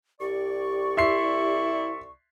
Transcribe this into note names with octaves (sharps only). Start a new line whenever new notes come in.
C2 G4 D5 C#6
E4 E5 C6 C7